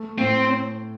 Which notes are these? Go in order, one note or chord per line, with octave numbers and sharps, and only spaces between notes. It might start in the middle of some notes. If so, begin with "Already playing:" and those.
Already playing: A3
A2 C4